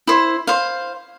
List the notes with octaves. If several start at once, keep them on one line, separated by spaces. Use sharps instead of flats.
E4 C5
C5 F5